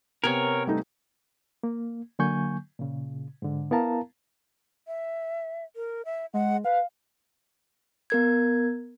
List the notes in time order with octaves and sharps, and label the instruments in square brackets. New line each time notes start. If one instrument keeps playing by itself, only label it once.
[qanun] C3 B3 G#5 [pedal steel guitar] A#4 C#5
[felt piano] G3 A3 D#4
[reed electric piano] A#3
D3 F#3 A#3 G#5 C#6 G6
A#2 C#3
G#2 D3
B3 E4 A#4 F5 A5 A#5
[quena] E5
A#4
E5
[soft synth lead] G#3 [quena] F#5
[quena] B4 [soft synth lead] F5
[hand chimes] B3 A#4 G#6